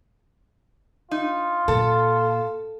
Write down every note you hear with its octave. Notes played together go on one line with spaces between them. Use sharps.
D#4 F4
A#2 A4